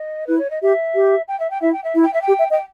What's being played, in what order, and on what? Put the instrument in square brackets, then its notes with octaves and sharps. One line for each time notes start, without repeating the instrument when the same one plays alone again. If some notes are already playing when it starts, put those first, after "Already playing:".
Already playing: [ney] D#5
[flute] E4 [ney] B4
[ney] C#5
D#5
[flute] G4 [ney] E5
[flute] G4
[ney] G5
E5
G5
[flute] E4 [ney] E5
[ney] G5
E5
[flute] E4
[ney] G5
E5
G5
[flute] G4
E5
[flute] D#5 [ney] G5